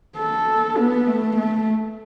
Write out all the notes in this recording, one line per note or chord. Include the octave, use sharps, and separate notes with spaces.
A4
B3
A3
A3